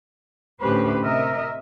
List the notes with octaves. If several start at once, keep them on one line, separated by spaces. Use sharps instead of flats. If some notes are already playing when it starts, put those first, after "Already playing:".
D2 A2 C#4 G4 B4 C5
C3 A#4 D#5 E5